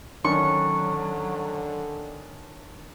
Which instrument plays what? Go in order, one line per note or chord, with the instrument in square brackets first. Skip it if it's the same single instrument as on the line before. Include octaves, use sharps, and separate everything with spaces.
[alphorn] D3 [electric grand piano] D#3 C#4 D4 [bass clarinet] F#3 [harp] C#6